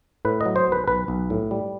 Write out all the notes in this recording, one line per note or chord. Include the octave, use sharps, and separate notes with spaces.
A2 B4
D#5
F#3
C5
B1 B4
B1 B4
B1
A2
G3